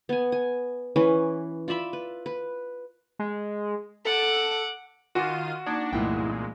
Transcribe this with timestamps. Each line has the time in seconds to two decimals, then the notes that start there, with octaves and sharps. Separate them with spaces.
0.09 B3 G#5
0.32 G#5
0.96 E3 C#4 B4
1.68 F4 D5 E5 B5
1.93 B4
2.26 B4
3.19 G#3
4.05 A4 F#5 D6
5.15 D#3 F4 F#4 G#5 D6 D#7
5.66 A#3 D4 D#4 G#6
5.93 C2 G2 A#2 E3 G#3 A3 E4 G5